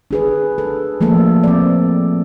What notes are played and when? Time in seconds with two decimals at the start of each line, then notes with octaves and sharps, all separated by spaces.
0.11 D4 G#4 B4
0.58 A4
1.01 F3 A3 A#3 A4
1.43 C4 D5